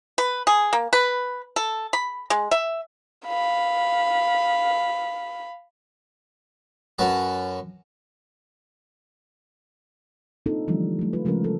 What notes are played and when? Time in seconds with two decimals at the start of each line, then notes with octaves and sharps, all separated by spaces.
0.18 B4
0.47 G#4
0.73 A#3
0.93 B4
1.56 A4
1.93 B5
2.30 G#3
2.51 E5
3.27 F5 B5
6.99 F#2 C#4 F#4 B4 A5 A#5
10.46 A#3 C4 D4 D#4 F4 A4
10.68 D3 E3 F3 G3 A3 D4
10.99 F#3 A3
11.13 F4 B4
11.25 C#3 F3 G#3 A3 C#4 A#4
11.44 A4